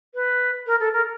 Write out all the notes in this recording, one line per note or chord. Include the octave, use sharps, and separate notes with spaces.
B4
A#4
A4
A#4